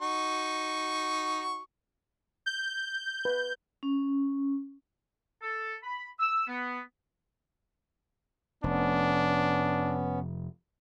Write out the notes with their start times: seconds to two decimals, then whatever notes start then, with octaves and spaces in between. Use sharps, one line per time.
0.02 D#4 F#4 C#6
2.46 G6
3.25 B4
3.83 C#4
5.41 A4
5.83 B5
6.20 E6
6.47 B3
8.64 F1 B3 C#4 D4